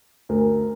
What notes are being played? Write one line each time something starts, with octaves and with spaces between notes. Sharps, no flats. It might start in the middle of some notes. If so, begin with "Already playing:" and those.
D2 A#4